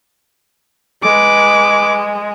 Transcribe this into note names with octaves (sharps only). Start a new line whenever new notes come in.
G#3 B4 D6